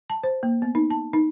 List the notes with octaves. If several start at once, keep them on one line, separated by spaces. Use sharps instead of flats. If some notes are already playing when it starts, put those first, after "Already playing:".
A5
C5
A#3
B3
D#4
A5
D#4